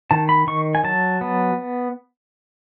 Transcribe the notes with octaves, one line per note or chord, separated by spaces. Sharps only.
D#3 A5
B5
D#3 C#6
G#5
F#3 A5
B3